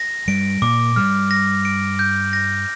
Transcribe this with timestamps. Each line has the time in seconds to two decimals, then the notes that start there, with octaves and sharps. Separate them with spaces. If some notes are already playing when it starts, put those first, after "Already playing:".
Already playing: A#6
0.28 G2 G3 D7
0.62 A#2 A#3 D6
0.96 G2 G3 F6
1.31 A#6
1.65 D7
1.99 G6
2.33 A#6